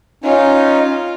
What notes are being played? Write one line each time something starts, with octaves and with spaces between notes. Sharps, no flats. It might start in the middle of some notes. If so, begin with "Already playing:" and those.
C#4 D#4 F4